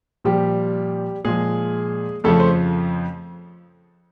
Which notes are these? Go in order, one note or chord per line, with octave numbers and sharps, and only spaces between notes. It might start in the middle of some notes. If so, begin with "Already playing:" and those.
A#2 F3 G3 G4
A#2 F3 G#3 G#4
F2 C#3 F3 A3 A4
C5